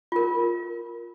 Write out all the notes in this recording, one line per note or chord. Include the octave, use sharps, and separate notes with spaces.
F4 A#4